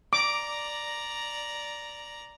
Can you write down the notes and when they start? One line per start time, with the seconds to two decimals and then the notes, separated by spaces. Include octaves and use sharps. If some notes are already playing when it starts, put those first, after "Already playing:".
0.13 D5 A#5 D6